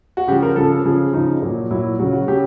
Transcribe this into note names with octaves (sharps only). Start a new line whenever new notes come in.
F#4
C#3 F3 G4
A#4
C#3 F3 A4
C#3 F3 G#4
C#3 F3 D#4
A#2 F#3
A#2 F#3 E4
C#3 F#3 F#4
F#4
C#3 F#3 G4